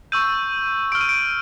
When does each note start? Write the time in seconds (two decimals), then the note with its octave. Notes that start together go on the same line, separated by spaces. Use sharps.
0.12 C#6 E6 G6 D#7
0.92 C#6 F6 D7
1.01 D#7
1.09 D7